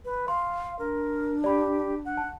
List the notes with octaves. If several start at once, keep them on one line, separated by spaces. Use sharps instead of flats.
B4
F5 C6
D4 A#4
G4 D5 B5
F#5
A5